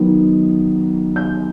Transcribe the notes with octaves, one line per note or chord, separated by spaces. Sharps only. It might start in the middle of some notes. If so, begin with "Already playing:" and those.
Already playing: D#3 F#3 B3
G6